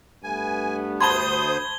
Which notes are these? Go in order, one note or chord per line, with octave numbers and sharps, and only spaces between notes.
G2 A3 B3 G#5
D2 C5 A5 B5 C6 D#6 G#6 G7